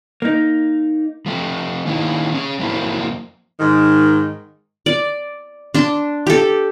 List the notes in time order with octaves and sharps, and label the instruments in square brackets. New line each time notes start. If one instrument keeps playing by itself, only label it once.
[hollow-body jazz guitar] A#3 D#4
[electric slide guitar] F3 A3
D#3 A#3 C#4 D#4 E4 G#4
C#4 G#4
F2 F#3 A#3 E4 C5
[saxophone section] G#2 D#3
[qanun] D5
D4 C6
G4 A4